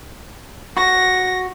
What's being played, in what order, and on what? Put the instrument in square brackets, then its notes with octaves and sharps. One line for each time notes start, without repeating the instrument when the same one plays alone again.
[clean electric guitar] F#4 [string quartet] A#6